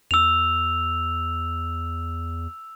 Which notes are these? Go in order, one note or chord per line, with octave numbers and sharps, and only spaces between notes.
E2 E6 F7